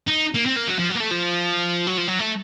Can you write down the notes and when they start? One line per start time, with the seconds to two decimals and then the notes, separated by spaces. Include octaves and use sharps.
0.08 D#4
0.35 A#3
0.46 C4
0.57 A#3
0.68 F#3
0.79 F3
0.90 F#3
0.95 A#3
1.00 A3
1.11 F3
1.87 F#3
1.98 F3
2.08 F#3
2.19 A3